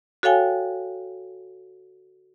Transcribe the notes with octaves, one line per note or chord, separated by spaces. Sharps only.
F#4 A4 C#5 F5 G5 G#5